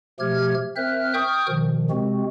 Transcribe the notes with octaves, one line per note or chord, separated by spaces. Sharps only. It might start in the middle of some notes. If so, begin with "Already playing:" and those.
B2 F3 A3 G4 F6 G#6
C4 A#4 C5 E5 F6 F#6
G5 C#6 D#6 F6 G6
B2 D#3 F3
C3 G#3 C4 F#4